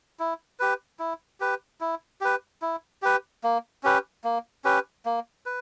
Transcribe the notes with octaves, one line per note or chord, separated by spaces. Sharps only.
E4
G4 B4
E4
G4 B4
E4
G4 B4
E4
G4 B4
A#3
C#4 G4 B4
A#3
C#4 G4 B4
A#3
B4